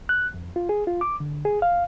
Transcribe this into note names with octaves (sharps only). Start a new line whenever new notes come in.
F#6
F2
F4
G#4
F4
D6
D3
G#4
F5